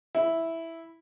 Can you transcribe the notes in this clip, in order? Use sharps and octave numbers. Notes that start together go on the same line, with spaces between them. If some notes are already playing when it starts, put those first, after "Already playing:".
E4